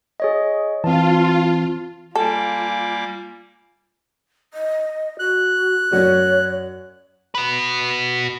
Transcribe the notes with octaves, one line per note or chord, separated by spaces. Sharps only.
G#4 C#5 D#5
E3 C4 F4 A5
G3 A#3 F4 A4 G#5 D6
D#5
F#4 F#6
F#2 F#4 C#5 D5
F#4 B4